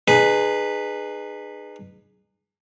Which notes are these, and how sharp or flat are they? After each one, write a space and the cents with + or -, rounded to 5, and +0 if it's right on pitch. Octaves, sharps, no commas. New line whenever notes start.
D#4 -40 G#4 +0 B4 +0